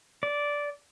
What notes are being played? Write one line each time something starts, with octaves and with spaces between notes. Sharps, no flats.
D5